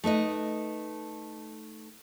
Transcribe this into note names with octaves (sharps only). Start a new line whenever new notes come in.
A3 D#4 B4 D#5